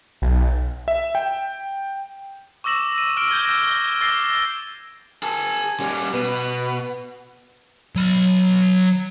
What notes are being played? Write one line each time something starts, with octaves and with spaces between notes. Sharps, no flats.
B1
E5
G5
C#6 D6 E6 A#6 E7 F#7
D#7
E6 F6 D7
G6 G#6 G7
F6 A#6
D6 E6 A6 A#6 C7 G7
G#4 G#5 A5
G3 C#4
B2 B4
F#3 B5